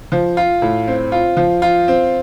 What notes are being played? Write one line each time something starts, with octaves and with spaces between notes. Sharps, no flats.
F3
F4
A2
C4
F4
F3
F4
C4